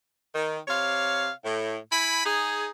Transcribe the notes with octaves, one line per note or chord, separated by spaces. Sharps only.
D#3
C3 C#5 F5
A2
E4 G#5 B5
D#4 G#4